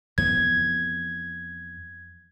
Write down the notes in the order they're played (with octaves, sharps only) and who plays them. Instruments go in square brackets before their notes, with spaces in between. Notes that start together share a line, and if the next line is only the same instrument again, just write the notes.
[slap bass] F2 E3 B3 [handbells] G#6